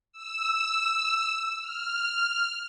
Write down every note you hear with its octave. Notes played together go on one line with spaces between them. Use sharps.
E6
F6